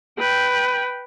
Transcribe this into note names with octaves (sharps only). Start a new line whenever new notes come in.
B4 G5